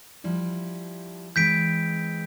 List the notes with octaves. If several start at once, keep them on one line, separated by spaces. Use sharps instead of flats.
F3 G3 E4
E3 G#3 C4 G6 B6 D7